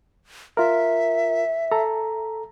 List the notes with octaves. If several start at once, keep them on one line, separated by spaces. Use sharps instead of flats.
F4 A#4 E5
A4 A#5